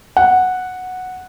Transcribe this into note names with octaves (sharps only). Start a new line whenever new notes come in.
F#5